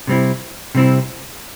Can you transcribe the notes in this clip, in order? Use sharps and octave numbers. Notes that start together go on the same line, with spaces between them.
C3 G3 C4 E4
C3 G3 C4 E4